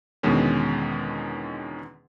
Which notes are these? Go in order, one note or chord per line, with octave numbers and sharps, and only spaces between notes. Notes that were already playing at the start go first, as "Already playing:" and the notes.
E2 B2 D3 D#3 G#3 C#4